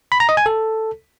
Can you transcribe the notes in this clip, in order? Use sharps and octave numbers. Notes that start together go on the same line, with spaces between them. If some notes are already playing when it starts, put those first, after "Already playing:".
B5
A#5
D#5
G#5
A4